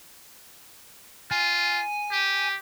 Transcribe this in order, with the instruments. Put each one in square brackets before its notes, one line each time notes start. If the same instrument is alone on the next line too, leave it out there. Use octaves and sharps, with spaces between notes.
[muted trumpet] F4 [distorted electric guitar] G#5
[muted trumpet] G4